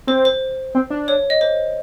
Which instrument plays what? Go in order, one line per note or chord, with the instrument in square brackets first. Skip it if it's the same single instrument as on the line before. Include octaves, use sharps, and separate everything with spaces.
[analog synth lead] C4 [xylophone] C5
[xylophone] C5
[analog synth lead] C4
D4
[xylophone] C#5
D#5
C5